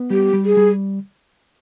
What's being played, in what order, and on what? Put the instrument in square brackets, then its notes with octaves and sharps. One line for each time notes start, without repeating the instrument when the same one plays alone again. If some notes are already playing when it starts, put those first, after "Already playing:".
Already playing: [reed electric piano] B3
[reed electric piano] G3 [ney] G4
[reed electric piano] G3
[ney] G#4
[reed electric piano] G3